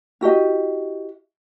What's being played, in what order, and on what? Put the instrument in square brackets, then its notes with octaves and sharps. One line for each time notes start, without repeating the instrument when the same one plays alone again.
[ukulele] E4 F#4 G4 D#5